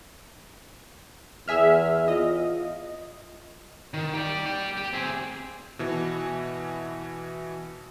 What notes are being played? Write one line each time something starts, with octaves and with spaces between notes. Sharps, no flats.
E2 G#4 E5 F6
F4 D#5
D#3
G4 D5
G4 D5
G4
C4 G#4
B2 E3